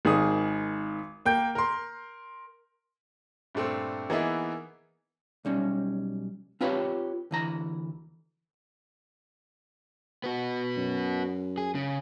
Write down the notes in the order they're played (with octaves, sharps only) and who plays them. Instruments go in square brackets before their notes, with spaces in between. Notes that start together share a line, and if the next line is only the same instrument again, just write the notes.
[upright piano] G#1 D#3 G#4 D#6
A#3 G5 G6
A#4 C6
[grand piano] G2 A#2 A3 C4
E3 A#3 B3 D#4 G#4 E5
[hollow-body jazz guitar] B1 G3 C#4
C4 F4 G4 B4 C#5
D2 E3 A#5
[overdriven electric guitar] B3 F#4
[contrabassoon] F#2
[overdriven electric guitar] G#4
C#3